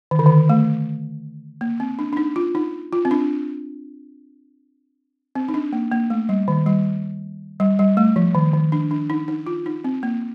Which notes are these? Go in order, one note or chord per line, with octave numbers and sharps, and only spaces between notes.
D#3
D3
D#3
A3
A#3
C4
D4
D4
D#4
F4
D#4
F4
C4
D4
C4
D#4
D4
A#3
A#3
A3
G3
D#3
G3
G3
G3
A3
F3
D#3
D#3
D4
D4
D#4
D#4
F4
D#4
C4
A#3